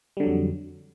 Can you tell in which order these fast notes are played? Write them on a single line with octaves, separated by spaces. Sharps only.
G3 D3 F#3 F2